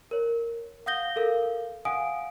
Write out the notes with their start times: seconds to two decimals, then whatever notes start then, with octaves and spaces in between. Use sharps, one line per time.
0.11 A#4 C#5
0.86 F5 F#5 D#6 G6 A#6 G7
1.16 A4 A#4 F5
1.85 F5 F#5 G#5 D#6 D7